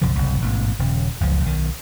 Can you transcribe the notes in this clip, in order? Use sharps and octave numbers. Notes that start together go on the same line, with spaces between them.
B1 F#2 C#3 F3
F#1 C2
A1 G#2 B2
D#1 C#3
F#1 C#2 F3
B1 D#3